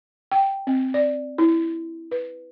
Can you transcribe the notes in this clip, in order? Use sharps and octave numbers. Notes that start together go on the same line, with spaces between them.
G5
C4
D5
E4
B4